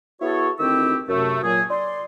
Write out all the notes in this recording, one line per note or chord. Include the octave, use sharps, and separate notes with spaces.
B3 E4 F#4 G#4 A4 C#5
D2 D#3 C4 E4 G4 E6
F#2 C3 A3
A#2 F#3 G#4
D5 C6